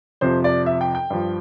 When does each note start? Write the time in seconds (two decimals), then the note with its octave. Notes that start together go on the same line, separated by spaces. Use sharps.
0.21 F2 C3 F3 C5
0.44 D5
0.66 E5
0.81 G5
0.95 G5
1.10 G2 F3